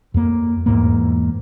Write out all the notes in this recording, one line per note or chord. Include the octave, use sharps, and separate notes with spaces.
F2 A#3
E2 G#2 A#3